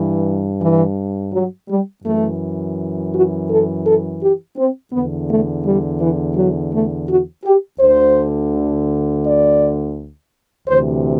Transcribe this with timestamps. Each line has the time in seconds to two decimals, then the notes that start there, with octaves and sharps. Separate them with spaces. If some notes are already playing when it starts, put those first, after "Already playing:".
Already playing: G2 E3
0.62 E3
1.33 F#3
1.69 G3
2.04 F#2 E3 A3
3.13 F#4
3.49 A4
3.85 A4
4.21 G4
4.57 C4
4.92 E2 D3 B3
5.29 A3
5.65 G3
6.00 E3
6.36 F#3
6.72 A3
7.08 F#4
7.45 G4
7.80 D2 D3 C5
9.25 D5
10.68 D2 C3 E3 C5